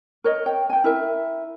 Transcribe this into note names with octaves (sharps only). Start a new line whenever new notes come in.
A#4 C#5 D#5
G5
G5 G#5
E4 A#4 E5